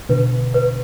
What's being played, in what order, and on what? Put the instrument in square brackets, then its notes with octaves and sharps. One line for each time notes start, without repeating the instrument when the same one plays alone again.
[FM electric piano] B2 D3 [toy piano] B4
[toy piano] B4